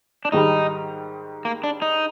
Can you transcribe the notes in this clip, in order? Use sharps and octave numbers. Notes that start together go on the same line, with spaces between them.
D4
G#2 D#3 G3 D#4
A#3
D4
D#4